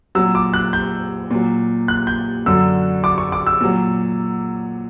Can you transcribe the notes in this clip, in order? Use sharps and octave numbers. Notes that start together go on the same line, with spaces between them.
A#2 F#3 E6
D6
F#6
G6
A#2 F#3
F#6
G6
F#2 D3 F#3 E6
D6
C#6
D6
E6
A#2 F#3